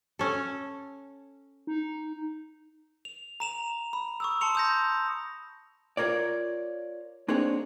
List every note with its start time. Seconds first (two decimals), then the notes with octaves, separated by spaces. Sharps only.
0.19 C#4 A4
1.67 D#4
3.05 F7
3.40 A#5 E7 F7
3.93 B5
4.20 C#6 D#6 E6
4.41 A5 C6 C#7 F7
4.55 D#6 G6 A#6
5.97 F4 A#4 C#5 D5
7.28 A#3 C4 D4 D#4 G#4 C#5